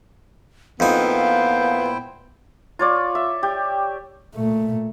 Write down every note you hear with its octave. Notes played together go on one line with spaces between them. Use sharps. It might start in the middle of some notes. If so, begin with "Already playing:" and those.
F2 A#2 B3 D#4 E4 C5 F5 G5
F4 C#5 D5
E5
G4
A#2 A3